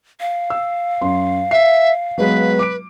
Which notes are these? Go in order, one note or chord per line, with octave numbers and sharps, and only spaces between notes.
F5
E6
F#2 C6
E5 C7
F#3 G#3 B3 B4
D6 D7